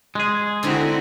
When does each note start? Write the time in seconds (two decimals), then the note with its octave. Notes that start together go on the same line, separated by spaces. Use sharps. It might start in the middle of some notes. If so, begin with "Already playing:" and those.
0.15 G#3 G#4
0.63 D3 C4 D#4 E4 F#4